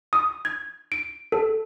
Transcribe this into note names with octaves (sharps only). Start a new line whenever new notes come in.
D#6
G#6
D7
A4